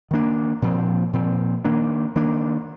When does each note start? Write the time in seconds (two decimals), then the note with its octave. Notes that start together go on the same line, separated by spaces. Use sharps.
0.11 D#3 A#3 D4
0.62 A#2 F3 C4
1.13 A#2 F3 C4
1.65 D#3 A#3 D4
2.15 D#3 A#3 D4